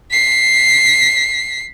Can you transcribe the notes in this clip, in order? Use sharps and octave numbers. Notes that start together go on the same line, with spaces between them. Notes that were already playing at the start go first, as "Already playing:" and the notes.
B6 C7